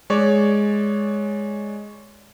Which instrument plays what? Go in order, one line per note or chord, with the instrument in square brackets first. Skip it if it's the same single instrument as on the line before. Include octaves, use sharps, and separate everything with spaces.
[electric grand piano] G#3 C#5 D5